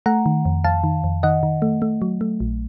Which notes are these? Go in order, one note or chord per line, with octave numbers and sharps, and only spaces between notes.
A3 F#5 A#5
D#3
F2
F2 F5 A5
D#3
F2
D#3 D#5 F#5
D#3
A3
A3
F#3
A3
A#1